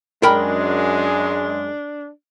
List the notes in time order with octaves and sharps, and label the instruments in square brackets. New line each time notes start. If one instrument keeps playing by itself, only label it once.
[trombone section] F#2 G#3 [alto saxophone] D4 [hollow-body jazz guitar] A#4 G5 B5